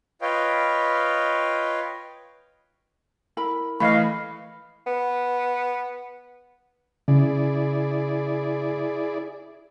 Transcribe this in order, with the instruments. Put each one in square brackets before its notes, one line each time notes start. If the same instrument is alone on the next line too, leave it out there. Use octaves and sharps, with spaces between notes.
[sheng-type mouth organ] F4 B4 C#5 D#5 F5 G5
[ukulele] E4 A#4 B5
[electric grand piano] E3 A3 [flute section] D#5 F5 C#6 [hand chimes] B5 F6
[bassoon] B3
[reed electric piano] C#3 [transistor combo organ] E4 G#4 D5